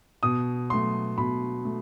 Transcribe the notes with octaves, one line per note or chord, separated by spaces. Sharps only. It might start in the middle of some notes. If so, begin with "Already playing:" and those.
B2 D#6
F#3 A3 C6
B2 B5
A3